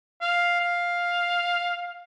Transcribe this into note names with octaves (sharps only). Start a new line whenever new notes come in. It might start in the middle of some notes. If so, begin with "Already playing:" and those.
F5
F5